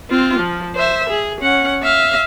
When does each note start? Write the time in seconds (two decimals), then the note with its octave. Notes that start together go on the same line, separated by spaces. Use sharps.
0.10 C4 F4
0.40 F3
0.75 C5 E5
1.09 G#4
1.41 C#4 F#5
1.83 E5 F5